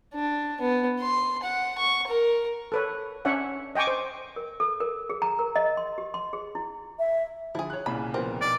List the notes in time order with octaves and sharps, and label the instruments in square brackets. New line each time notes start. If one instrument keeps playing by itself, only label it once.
[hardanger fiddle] D4
B3
C6
F#5
C#6
A#4
[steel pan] A4 B4 C#5
C#4 D4 C#5 E5 F#5
D#5 G5 G#5 C#6 D6
C5
[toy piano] A#4
A4
A#4
G#4
A#5
A#4
D#5
C6
G4
C6
G#4
E4
[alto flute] E5
[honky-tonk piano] D3 F3 [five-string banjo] E4 G#4
[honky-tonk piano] C#5 F#6
[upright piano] C2 A#2 C#3 [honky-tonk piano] G#5 [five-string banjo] B5
[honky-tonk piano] F3 B3 A#4 [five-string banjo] C4
[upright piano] B1 [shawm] D5